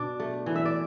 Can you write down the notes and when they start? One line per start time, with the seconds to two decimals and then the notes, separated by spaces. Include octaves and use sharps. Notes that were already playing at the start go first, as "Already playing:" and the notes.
Already playing: B2 D4 D5
0.20 A3
0.46 E3
0.56 E5
0.65 D5